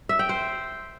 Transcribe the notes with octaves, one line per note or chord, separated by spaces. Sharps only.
E5
G5
C5